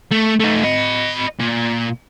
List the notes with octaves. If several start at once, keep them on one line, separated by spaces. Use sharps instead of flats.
A3
A3 D#4
D#5 B5
A#2